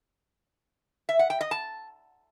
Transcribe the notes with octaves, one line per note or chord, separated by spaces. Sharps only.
E5
F#5
G5
D#5
A5